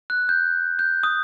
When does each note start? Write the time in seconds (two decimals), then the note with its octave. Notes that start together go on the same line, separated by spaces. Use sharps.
0.10 F#6
0.29 G6
0.79 G6
1.03 D#6